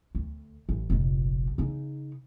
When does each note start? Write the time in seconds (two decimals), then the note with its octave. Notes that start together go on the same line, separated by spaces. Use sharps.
0.15 D2
0.69 A1
0.90 F1 A#1
1.58 C#3 D#4